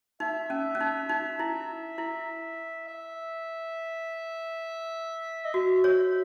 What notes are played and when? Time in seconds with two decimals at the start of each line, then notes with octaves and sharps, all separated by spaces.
0.20 D#4 E5
0.50 C#4
0.75 C#4
0.81 D#4
1.09 D#4
1.39 E4
1.98 E4
2.88 E5
5.45 D#5
5.54 F#4 E5
5.84 C#5